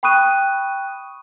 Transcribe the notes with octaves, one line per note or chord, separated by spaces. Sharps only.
G5 B5 C#6 D#6 F#6 D#7